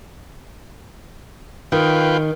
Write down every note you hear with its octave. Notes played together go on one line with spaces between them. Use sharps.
D#3 F4 B4 G5